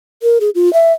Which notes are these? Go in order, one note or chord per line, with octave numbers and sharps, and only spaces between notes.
A#4
G#4
F4
E5